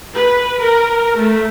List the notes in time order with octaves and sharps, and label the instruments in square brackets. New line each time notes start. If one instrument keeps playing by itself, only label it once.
[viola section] B4
A#4
A3